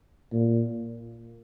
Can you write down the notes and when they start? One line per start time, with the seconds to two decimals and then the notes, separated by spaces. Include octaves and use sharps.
0.33 A#2